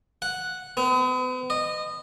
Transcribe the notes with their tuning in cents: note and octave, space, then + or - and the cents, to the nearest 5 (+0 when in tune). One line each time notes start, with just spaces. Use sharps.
F#5 -5
B3 +45
D#5 -20